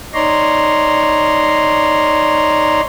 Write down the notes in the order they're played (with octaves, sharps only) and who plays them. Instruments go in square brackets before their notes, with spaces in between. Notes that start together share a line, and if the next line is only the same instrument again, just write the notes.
[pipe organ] D#4 C#5 D5 A#5 C6